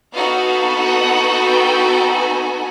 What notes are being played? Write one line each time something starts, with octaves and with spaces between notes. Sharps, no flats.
B3 D#4 F#4 A4 F5
F#5
G5
G#5